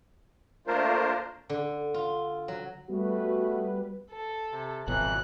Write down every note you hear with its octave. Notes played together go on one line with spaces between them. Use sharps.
A3 A#3 D4 F4 A#4 C5
D3
F4
F#3
G3 A3 B3 F#4 B4
A4
C3
G#1 F2 B2 E3 F#3 F#6